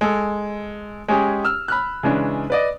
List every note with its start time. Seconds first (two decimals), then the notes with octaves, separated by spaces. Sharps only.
0.01 G#3 A4
1.08 G#3 C#4 G4 G#4
1.45 E6 F6
1.68 B5 F6 F#6
2.03 C#3 E3 G#3 C#4 D4
2.50 B4 D5 D#5